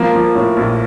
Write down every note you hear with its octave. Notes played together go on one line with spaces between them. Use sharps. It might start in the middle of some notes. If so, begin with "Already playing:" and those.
Already playing: F3 A#3
F3
A2
A#1